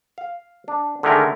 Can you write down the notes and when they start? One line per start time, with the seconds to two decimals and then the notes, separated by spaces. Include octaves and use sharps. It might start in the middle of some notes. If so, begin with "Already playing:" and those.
0.18 F5
0.68 D4
1.03 D3 D#3 G#3 A3 A#4